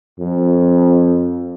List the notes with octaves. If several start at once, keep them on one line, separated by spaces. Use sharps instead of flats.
F2